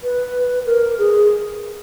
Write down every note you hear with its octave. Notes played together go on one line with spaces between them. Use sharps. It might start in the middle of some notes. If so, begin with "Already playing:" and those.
B4
A#4
G#4